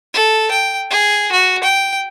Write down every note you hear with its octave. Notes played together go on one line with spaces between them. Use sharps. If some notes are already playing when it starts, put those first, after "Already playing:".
A4
G5
G#4
F#4
G5